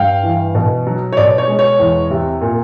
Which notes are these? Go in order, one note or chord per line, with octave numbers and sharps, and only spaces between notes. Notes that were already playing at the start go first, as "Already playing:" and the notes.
Already playing: G2 F5 G5
E3
B2
F#3
C#5
B2 D5
C#5
G#3
C#5
E2
C3
A#2